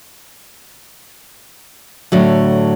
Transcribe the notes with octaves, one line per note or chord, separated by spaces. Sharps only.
A2 D3 F#3